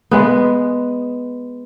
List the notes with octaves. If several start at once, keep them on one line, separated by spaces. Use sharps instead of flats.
G#3 B3